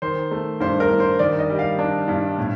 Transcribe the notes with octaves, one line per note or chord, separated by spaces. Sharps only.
D#3 C5
A3
G2 C5
A#4
G2
C5
D#3 D5
D#5
G3
F5
D4
G2
A2